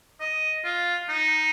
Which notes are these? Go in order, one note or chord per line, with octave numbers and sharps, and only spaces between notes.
D#5
F4
D#4